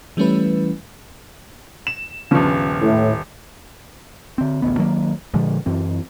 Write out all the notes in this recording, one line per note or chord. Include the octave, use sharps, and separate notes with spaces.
E3 G3 A3 C#4 E4 B4
E7
D#1 G2 C#3 F3 B3
A2
D3 C4
A1 D2 C3 B3
D#3 F#3 G3 A#3
A#2 D3 F3 G#3
F#2 E3 C4